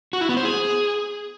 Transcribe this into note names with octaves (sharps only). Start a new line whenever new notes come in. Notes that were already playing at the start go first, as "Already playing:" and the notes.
F#4
E4
B3
C5
G#4